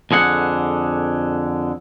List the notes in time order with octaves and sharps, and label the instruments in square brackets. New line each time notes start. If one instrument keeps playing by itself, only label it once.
[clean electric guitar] F2 D3 G#4 F#5